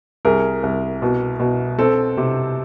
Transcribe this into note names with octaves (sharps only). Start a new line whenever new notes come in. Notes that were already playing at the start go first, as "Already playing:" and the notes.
C2 G#4 A#4
C2
B2
B2
C4 A4
C3